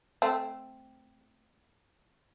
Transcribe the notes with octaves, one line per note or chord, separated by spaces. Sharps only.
A3 C4